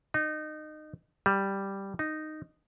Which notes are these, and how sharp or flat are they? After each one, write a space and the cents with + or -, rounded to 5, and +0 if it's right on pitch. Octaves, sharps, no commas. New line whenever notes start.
D#4 -25
G3 +0
D#4 -10